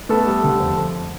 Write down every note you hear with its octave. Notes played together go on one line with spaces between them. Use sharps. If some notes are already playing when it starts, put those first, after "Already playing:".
A3 B3 A4
G3
D3
F2